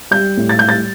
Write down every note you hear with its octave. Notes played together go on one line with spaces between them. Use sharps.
G3 G6
A2
A6
G3 G6
A6